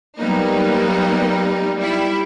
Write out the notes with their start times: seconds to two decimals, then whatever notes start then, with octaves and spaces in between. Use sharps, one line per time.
0.18 F#3 G3 A#3 B3 D#4
1.76 G3 E4